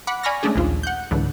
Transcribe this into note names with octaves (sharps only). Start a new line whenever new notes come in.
F#5 B5 D6
D5 G#5 B5 C#6 F6 A#6
G#3 A3 C#4 D4 G#4
A#1 D#2 F4
F#5 G6
C#2 G#2 D3 E3